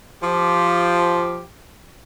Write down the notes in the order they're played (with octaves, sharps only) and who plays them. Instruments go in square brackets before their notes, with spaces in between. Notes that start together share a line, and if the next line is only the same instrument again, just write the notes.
[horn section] F3 G4